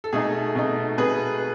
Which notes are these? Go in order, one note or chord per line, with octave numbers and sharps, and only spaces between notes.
A4
B2 A3 D#4 G#4
B2 A3 D#4
B2 A3 G#4 B4